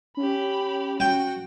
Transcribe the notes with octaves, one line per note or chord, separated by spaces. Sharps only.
C#4 G4 B5
F#4 G5